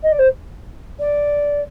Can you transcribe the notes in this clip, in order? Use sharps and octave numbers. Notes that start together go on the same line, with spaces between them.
D#5
D5
C5
D5